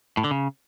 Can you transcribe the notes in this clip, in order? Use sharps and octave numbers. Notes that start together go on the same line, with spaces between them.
A2
D3
C#3